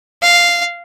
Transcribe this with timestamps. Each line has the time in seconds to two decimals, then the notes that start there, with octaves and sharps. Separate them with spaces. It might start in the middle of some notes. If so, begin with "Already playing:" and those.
0.22 F5